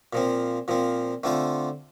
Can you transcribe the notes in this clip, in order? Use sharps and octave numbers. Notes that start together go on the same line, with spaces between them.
A#2 F3 C4
A#2 F3 C4
D3 A3 C4 F4 C5